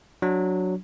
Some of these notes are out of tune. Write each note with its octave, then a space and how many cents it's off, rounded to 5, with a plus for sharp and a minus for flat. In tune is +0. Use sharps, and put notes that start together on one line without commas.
F#3 -5 D4 +0